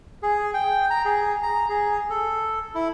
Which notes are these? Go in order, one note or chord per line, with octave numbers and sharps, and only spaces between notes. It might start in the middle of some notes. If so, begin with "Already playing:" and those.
G#4
G5
A#5
G#4
A#5
G#4
A4
E4